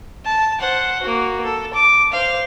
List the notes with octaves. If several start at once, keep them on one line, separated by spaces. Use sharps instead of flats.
A5
C5 F#5
A#3 F#4
A4
D6
C5 F5